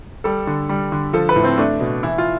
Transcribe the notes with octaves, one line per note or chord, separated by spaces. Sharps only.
G3 A4
D3
G3
D3
F3 A4
B4
A2
C4
A3 D4
B2
E3 E4
F4